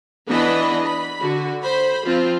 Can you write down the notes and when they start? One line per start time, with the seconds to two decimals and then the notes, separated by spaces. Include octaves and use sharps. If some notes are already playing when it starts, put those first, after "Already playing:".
0.29 E3 B3 D4 B4 D#5 B5
0.84 B5
1.21 D3 F#4
1.63 C5 B5
2.06 F3 C4 F4